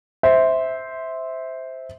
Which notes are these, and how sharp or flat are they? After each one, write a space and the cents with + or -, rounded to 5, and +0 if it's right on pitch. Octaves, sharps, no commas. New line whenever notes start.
C5 -5 E5 -15